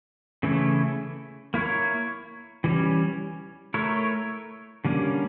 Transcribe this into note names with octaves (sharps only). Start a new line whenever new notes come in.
C#3 E3 A3 C#4 E4
A#3 E4 A#4 C#5
E3 G3 C#4
A3 E4 A#4 C#5
D3 G3 A#3 C#4